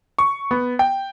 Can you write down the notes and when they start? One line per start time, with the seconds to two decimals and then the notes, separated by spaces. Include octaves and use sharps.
0.18 C#6
0.51 B3
0.79 G5